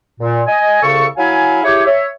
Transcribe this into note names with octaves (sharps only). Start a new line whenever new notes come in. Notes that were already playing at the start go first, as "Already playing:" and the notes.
A#2
D#5 G#5
C2 C#3 A4 C#6
F#3 E4 F5 G#5
E4 G4 G#4 C#5
C#5 E5